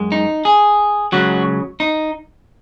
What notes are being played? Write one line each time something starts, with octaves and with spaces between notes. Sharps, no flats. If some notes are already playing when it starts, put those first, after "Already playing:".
Already playing: F#2 G#3
D#4
G#4
C#2 C#3 F#3 F#4
D#4